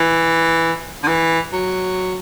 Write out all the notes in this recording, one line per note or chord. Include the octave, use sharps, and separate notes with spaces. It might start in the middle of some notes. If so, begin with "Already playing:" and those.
Already playing: E3
D3
E3
F#3